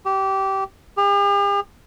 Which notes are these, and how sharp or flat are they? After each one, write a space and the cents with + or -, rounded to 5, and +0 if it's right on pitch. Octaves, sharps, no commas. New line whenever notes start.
G4 -20
G4 +45